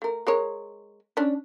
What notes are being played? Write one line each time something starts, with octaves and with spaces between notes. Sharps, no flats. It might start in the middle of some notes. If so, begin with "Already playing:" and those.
A3 A#4
G#3 A#4 C#5
C#4 D4